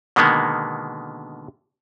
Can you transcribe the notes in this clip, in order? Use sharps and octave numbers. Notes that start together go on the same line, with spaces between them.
B2 D3 D#3 G#3 A#3 B3